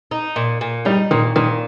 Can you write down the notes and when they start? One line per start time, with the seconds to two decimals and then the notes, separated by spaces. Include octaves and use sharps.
0.11 D#4
0.36 A#2
0.61 A#2
0.85 G3 D#4
1.11 A#2 D#3
1.36 A#2 D#3